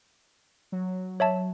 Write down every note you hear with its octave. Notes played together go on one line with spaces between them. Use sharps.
F#3
C#5 E5 A5